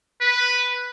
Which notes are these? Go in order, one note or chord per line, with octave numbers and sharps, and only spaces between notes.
B4